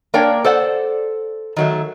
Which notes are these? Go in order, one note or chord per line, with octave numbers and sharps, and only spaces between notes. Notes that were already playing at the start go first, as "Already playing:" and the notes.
A#3 D4 A#4 C#5 D5 G5
A4 C5 D5 F#5
D#3 F#3 A3